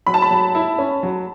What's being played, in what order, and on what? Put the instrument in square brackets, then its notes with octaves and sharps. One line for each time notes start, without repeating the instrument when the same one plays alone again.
[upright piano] F#3 [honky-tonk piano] B5
[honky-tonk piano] A5
B5
[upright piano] F#3
E4
C#4
F#3